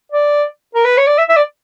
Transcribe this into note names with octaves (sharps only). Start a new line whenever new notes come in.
D5
A#4
B4
C#5
D5
E5
E5
D5